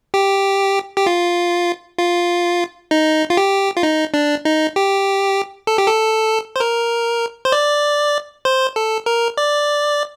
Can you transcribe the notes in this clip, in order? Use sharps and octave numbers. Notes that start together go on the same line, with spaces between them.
G4
G4
F4
F4
D#4
F4
G4
F4
D#4
D4
D#4
G4
A4
G4
A4
C5
A#4
C5
D5
C5
A4
A#4
D5